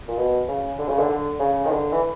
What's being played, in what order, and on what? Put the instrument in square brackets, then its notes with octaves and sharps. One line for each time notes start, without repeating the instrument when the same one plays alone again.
[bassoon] A#2
B2
C#3
D3
C#3
D3
D3
C#3
D#3
D3
E3